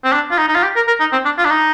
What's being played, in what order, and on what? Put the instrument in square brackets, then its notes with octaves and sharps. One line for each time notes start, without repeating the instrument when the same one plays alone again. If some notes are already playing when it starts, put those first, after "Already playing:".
[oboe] C4
D4
F4
D#4
D#4
F4
G4
A#4
A#4
D#4
C4
D4
F4
D4
D#4